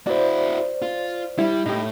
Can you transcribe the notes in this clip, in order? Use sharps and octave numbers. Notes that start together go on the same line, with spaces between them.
E4 F#4 C5 D5
F4
G3 E4
A2 D#4 G4